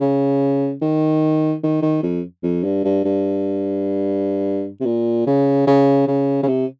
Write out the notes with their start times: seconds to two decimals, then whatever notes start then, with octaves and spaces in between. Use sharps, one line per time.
0.01 C#3
0.82 D#3
1.63 D#3
1.82 D#3
2.03 F2
2.43 F2
2.64 G2
2.84 G2
3.05 G2
4.81 C3
4.86 A#2
5.27 C#3
5.67 C#3
6.07 C#3
6.43 C#3
6.47 C3